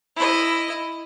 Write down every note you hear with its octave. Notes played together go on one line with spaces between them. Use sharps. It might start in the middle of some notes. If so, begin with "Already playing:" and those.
E4 D#5